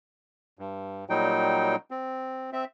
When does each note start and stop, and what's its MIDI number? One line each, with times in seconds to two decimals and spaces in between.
0.59 1.05 43
1.10 1.76 46
1.10 1.76 54
1.10 1.76 55
1.10 1.76 63
1.10 1.76 79
1.91 2.50 60
2.53 2.65 60
2.53 2.65 76